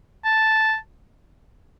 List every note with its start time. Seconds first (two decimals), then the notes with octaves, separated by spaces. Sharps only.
0.25 A5